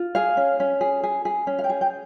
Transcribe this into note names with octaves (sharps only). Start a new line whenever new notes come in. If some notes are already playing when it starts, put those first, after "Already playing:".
Already playing: F4
G#4 F5
C#4
C#4
G#4
G#4
G#4
C#4
F5
G5
G#4
G5